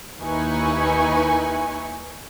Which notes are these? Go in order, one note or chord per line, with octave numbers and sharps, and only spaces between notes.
D#2 D#4 E4 B4 G#5 C#6